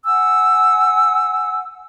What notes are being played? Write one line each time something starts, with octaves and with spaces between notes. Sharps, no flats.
F#5 G#5 E6